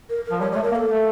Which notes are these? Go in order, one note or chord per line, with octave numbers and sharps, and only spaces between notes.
A#4
A#4
F3
G3 C#5
G3 A3 C#5
A#4
A#3
A4
A3